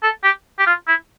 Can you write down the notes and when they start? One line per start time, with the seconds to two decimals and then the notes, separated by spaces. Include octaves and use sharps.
0.03 A4
0.24 G4
0.59 G4
0.66 F4
0.87 E4